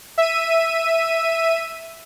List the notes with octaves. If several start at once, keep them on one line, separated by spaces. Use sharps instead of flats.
E5 D#7